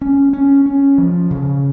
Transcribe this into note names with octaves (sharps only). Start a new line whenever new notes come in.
C#4
C#4
C#4
F3
C#3